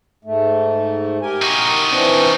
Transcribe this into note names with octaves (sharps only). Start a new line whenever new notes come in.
G#2 A3
G4 A#4 G#5
D#4 F#4
E3 C4 D4